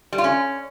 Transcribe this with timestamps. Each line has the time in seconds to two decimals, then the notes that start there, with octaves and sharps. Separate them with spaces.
0.13 G3
0.18 F4
0.24 C#4